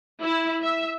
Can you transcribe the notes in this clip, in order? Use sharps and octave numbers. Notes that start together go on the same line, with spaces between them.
E4
E5